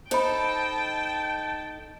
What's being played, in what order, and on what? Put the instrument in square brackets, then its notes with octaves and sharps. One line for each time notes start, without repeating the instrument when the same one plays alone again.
[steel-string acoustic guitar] D#4 A4 [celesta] C5 B5 [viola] G5 A5